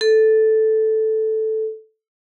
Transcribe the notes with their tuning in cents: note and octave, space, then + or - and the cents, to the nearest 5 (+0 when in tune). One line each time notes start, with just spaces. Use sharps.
A4 -5